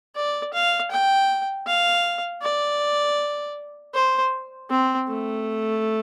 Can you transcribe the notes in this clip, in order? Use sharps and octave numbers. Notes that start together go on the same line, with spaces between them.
D5
F5
G5
F5
D5
C5
C4
A3